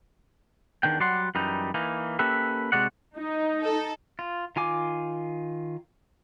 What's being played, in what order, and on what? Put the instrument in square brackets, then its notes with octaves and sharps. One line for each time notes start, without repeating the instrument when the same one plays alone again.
[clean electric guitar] E2 D#3 D4 G5
F#3 G3 D5 F#5 C6
F#2 E3 G3 D#4
E3 A#3 D#4
A#3 C#4 G4 A4 B4 E5
C3 G#3 F#4 D5 F#5
[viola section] D#4
[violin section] A4
[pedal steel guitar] F4
D#3 F4 G#5 D6